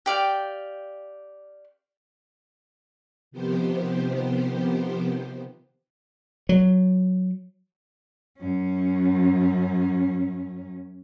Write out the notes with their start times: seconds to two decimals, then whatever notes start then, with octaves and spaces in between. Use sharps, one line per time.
0.06 G4 D5 F5 G5
3.31 C3 D#3 F3 B3 G4 C5
6.49 F#3
8.38 F#2 C#4